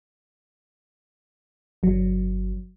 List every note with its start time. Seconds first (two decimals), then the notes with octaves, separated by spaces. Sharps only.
1.83 G1 F#3